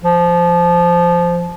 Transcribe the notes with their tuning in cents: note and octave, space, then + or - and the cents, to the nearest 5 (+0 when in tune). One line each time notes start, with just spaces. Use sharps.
F3 -10